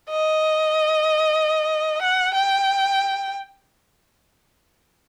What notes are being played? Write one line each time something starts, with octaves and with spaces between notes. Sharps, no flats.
D#5
F#5
G5